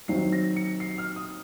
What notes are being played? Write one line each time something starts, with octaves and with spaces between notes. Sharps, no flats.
D#2 D#3 F#3 C4 D#4 C7
A#6
C#7
C7
F6
D#6